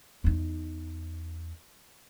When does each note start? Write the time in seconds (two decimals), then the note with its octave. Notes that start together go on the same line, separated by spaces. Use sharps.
0.24 E2 D#4